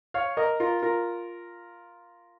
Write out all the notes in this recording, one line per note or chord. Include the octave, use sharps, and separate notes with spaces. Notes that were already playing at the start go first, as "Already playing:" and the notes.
C#5 F5
A#4 D#5
F4 A#4
F4 A#4